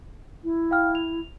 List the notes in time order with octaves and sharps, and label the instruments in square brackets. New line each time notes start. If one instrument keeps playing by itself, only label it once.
[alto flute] E4
[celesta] F5 G5 F6
F7